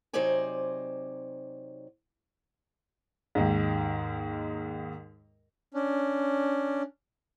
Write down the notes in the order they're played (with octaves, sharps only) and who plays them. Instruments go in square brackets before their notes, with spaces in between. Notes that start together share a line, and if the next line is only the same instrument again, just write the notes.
[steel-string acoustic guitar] C3 F#3 D#4 C5 D5 G#5
[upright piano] D#2 G#2
[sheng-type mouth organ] C#4 D4